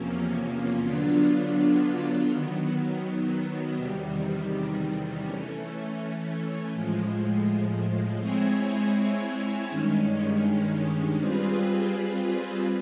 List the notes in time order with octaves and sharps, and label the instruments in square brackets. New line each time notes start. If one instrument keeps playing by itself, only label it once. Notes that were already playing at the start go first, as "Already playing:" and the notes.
Already playing: [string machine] E2 C3 F3 A#3 C#4
D3 F#3 B3 D4 F4
D#3 F#3 B3
E2 C3 D#3 G3
E3 A3 C#4
A2 F3 G#3
G#3 C4 E4 G#4 C#5
G2 D#3 G#3 C#4
G3 C4 F4 G#4 B4